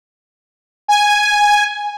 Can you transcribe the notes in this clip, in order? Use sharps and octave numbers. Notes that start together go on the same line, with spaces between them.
G#5